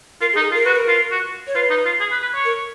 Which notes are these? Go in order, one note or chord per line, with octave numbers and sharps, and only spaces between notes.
F4 A#4
G#4
D#4
A#4
G#4
F4
A#4
F#4 B4
A#4
F4
F#4
C#5
F4 B4
D#4
F4
G#4
B4
B4
C#5
A#4